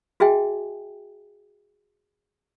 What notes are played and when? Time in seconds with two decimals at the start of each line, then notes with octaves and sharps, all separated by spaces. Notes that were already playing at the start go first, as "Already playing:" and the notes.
0.20 F#4 G#4 D#5 E5 G5 G#5